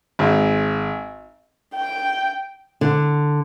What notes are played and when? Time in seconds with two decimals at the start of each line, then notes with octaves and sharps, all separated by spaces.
0.19 G#1
1.75 G5
2.81 D3